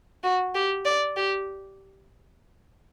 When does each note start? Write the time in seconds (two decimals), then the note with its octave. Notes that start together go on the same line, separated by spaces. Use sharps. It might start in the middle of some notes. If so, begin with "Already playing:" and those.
0.23 F#4
0.55 G4
0.85 D5
1.16 G4